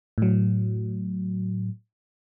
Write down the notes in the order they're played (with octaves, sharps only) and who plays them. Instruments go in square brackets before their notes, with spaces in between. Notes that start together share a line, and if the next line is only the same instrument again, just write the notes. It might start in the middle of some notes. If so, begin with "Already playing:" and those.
[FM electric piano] A2 F#3